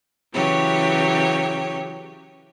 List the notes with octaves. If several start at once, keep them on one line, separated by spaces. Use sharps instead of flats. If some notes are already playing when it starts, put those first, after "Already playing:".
C#3 E3 F#3 G4 C#5